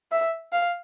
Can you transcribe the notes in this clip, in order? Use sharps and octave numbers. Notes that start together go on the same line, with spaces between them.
E5
F5